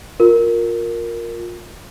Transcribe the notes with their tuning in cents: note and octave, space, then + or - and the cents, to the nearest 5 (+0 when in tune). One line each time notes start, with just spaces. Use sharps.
F4 +25 A#4 +0